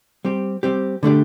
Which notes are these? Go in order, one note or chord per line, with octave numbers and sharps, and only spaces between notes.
G3 C4 G4
G3 C4 G4
D3 A3 D4 G4